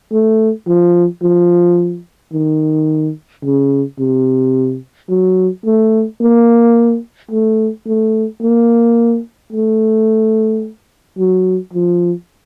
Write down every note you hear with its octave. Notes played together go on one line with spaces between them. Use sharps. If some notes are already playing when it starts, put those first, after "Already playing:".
A3
F3
F3
D#3
C#3
C3
F#3
A3
A#3
A3
A3
A#3
A3
F#3
F3